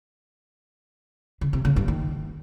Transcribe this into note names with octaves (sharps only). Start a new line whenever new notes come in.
C#3
C3
C#3
G2
D#3